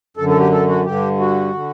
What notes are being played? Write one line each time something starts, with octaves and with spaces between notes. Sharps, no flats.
F#2 D3 A4
A4
G4
A4
F#4
G2 D3 G4
F#4
D3